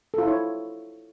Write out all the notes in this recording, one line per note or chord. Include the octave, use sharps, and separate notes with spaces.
E4 F4 A4 C#5